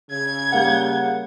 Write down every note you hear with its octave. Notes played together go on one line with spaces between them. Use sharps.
C#3 G#6
G3 A#3 F5 F#5